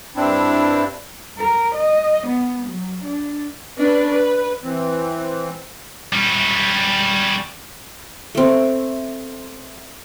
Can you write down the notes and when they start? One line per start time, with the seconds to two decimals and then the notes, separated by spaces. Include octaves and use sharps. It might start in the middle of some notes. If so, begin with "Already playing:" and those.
0.16 G2 C4 D4 E4
1.38 A#4
1.75 D#5
2.27 B3
2.68 F#3
3.04 D4
3.77 C#4 D4 B4
4.11 B4
4.63 E3 C4
6.13 G3 C#4
8.35 A3 C4